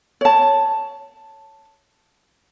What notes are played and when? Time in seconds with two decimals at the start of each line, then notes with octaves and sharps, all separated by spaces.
0.21 C#5 A5